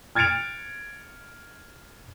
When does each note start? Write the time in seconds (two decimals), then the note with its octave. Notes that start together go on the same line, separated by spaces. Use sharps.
0.15 F6 G#6 A6 C#7 D7 F7